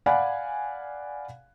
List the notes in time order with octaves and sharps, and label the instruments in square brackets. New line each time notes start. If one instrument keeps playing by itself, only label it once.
[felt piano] D5 F5 F#5 G#5 B5